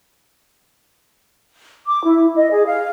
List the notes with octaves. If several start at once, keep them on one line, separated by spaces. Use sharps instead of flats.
D6
E4
D#5
G#4
F5